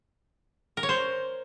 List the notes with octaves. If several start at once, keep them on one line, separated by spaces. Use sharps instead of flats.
A#4
C#5
C5